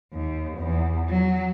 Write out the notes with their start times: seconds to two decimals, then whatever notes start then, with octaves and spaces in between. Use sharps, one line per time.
0.13 D#2
0.57 E2
1.09 F#3